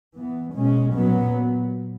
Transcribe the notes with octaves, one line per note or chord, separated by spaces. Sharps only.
E3 B3
B2 G#3 C#4
A#2 F#3 B3